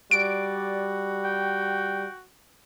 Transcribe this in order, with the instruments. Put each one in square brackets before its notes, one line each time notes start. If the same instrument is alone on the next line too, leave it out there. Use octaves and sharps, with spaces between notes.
[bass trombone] G3 [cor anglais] F#4 [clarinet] D5 [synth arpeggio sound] D7
[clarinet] G5